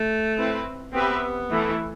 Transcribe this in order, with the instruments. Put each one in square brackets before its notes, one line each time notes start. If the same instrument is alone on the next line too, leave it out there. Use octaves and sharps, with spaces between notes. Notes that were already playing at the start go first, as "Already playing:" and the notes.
Already playing: [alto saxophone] A3
[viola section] C4 E4 B4
[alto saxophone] B3 [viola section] C4 G4 B4 E5
[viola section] E3 A3 E4 A4